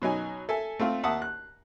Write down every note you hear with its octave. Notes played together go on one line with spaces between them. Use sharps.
B2 F#3 D#4 G#5
A4 E5 G#5
A3 C4 F4
D#2 E5 F#5 A5 D#6
F#6